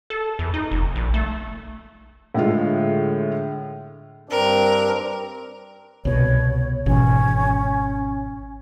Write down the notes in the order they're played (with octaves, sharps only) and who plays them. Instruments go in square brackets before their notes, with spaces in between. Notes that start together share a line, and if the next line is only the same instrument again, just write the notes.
[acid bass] A4
E2
D#4
F1
A#1
A3
[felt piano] A2 D3 G#3 F4
[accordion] G2 C4 D4 [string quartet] A#4
[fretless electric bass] C2 B2 [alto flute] C#5
[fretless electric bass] G#1 B2 E3 [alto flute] C#4